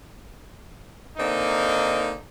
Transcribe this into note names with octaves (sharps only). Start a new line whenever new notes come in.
D3 A#3 C4 D#4